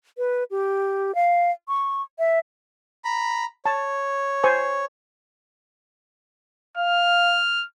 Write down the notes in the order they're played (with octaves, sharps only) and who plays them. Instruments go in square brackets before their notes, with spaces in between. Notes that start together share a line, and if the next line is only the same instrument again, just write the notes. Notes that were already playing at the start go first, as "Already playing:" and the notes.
[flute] B4
G4
F5
C#6
E5
[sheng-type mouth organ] A#5 B5
[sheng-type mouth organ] C#5 [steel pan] A5
[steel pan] C5 G#5 C#6
[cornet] F5 [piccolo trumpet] F6